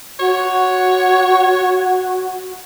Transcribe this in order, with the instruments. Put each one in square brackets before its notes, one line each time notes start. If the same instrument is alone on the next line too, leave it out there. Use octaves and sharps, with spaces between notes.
[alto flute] F#4 [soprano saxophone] C#5